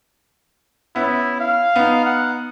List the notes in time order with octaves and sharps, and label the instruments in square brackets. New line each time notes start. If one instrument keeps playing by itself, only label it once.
[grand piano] B3 C#4 [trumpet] E4
[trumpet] F5
[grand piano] B3 D#4
[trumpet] F#5